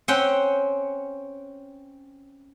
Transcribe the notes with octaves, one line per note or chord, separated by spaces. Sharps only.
C4 C#4 F#5 G5